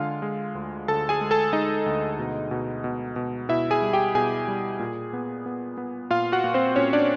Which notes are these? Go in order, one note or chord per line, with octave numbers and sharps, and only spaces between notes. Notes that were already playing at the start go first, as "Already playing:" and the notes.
Already playing: D3 G#3 F4 F5
G#3
D2
D2 A4 A5
G#4 G#5
G#3
A4 A5
G#3 D#4 D#5
D2
B2
B2
B2
B2
B2 E4 E5
G#4 G#5
G3
G4 G5
B2 G#4 G#5
G3
A#2
B3
B3
B3
A#2 F4 F5
F#4 F#5
A#2
C4 C5
A#2 C#4 C#5
D4 D5